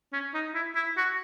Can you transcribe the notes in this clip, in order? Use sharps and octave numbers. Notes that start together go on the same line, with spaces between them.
C#4
D#4
E4
E4
F#4